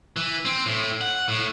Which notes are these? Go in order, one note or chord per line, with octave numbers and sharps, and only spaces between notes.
E3
C4
A2
F#5
A2